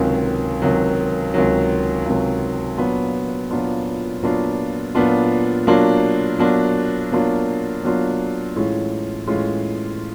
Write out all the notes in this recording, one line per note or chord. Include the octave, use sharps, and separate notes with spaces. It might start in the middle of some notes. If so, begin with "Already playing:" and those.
Already playing: C#2 C3 D#3 F#3
C#2 C3 D#3 F#3
C#2 C3 D#3 F#3
C#2 C3 D#3 F#3
A#2 F#3 B3 D4 F4
A#2 F#3 B3 D4 F4
A#2 F#3 B3 D4 F4
A#2 F#3 B3 D4 F4
B2 F#3 A#3 D4 F4
B2 F#3 A#3 D4 F4
B2 F#3 A#3 D4 F4
B2 F#3 A#3 D4 F4
A2 E3 G#3 C#4 F4
A2 E3 G#3 C#4 F4